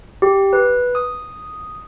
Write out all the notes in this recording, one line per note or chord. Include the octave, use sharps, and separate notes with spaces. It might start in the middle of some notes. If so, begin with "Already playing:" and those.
G4
B4
D#6